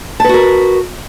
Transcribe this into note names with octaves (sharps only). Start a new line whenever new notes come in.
F#4 A#4 B4 A5